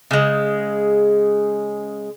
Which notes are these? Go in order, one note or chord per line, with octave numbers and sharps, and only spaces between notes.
C#3 G#3